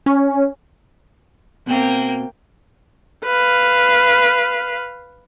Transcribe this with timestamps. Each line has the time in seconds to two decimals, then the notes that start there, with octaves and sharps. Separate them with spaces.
0.06 C#4
1.67 B2 A#3 C4 G5
3.25 B4 F5